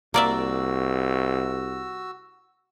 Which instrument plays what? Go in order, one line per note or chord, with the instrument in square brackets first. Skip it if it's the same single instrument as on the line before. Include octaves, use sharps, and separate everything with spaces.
[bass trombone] C2 [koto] A#3 D5 E5 [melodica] F#4 E6